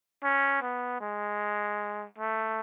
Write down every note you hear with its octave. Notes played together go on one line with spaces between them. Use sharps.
C#4
B3
G#3
A3